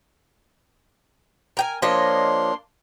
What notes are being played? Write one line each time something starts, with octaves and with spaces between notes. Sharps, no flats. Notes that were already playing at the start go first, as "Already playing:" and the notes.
A#4 G5 G#5
F3 A#3 D4 C#5 D#5 C6